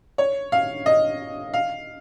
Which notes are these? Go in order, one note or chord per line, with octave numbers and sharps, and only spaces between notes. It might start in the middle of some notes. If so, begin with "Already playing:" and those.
C#5
F5
D#5
F5